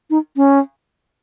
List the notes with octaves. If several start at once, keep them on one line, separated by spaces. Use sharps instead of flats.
D#4
C#4